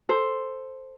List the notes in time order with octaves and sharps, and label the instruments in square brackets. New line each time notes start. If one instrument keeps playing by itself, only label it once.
[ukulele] A4 C5